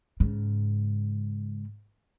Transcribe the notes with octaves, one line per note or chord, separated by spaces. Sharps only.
G#2 C#3